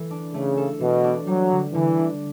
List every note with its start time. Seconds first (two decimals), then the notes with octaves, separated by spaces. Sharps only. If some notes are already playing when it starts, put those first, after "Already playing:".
Already playing: E3 A3 A4
0.11 D4
0.34 C#3 A3
0.57 A4
0.80 B2 E3
1.04 D4
1.27 F#3 G3
1.51 D3
1.74 D3 E3
1.97 D4